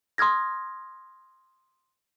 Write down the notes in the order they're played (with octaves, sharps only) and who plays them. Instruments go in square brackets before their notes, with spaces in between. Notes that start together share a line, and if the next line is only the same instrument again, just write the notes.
[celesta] C6 D#6 F6 G#6 A#6